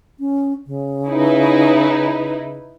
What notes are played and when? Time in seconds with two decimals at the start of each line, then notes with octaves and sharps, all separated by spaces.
0.20 C#4
0.66 C#3
1.08 D#4 E4 B4